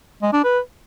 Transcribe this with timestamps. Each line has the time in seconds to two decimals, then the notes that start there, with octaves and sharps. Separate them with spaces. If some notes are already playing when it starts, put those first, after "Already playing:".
0.22 G#3
0.33 D4
0.44 B4